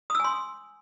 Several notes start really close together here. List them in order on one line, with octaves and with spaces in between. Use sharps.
D#6 E6 G#5 C6